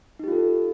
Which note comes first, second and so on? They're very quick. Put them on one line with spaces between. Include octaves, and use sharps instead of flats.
D#4 G4 F4 A4